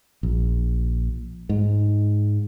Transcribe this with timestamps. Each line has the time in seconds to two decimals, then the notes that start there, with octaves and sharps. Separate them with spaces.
0.23 A#1
1.49 G#2